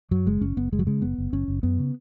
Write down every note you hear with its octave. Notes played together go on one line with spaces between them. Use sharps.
F#2 F#3
F#1 G#3
F#1 C#4
F#1 B3
F#1 G#3
F#3
C#3 G#3
F#1 B3
F#1
F#1 C#4
F#1
F#2 B3
C#3